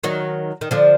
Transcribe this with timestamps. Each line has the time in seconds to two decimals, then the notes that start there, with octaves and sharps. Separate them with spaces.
0.04 D#3 F#3
0.61 D#3
0.71 D3 F3